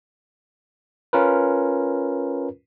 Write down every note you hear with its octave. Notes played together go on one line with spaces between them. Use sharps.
C#4 F4 A#4 B4